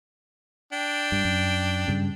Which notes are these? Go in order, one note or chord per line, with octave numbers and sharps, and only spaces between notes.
D4 G5
G2
F#2
G2 C#3